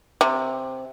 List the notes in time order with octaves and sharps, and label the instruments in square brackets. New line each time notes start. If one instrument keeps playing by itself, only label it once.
[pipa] C3